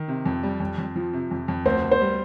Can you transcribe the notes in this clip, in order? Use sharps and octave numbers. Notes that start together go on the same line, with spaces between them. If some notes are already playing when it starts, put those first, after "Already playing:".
Already playing: D#3
C3
F2
G3
F2
F2
F3
C3
F2
F2
D2 C5
D2
C5
G3